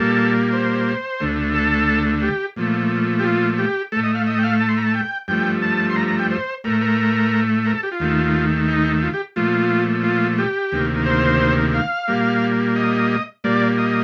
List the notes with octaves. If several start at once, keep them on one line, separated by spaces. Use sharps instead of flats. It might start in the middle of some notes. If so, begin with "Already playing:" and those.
Already playing: A#2 G3 A#3 A4
C5
D2 D3 A3
A4
G4
A#2 F3 A3
G4
F4
G4
A2 A3 A4
D#5
F5
D#5
G5
F5
A5
C6
A#5
A5
G5
G2 F3 A3 G5
A5
C6
A#5
A#5
G5
C5
A2 A3 A#4
A#4
A#4
A4
G4
F4
D#2 D#3 A3
D#4
F4
G4
A#2 F3 A3 F4
F4
G4
D2 C3 D#3 A#3
C5
F5
A#2 G3 A#3
D#5
A#2 G3 A#3 D5
D#5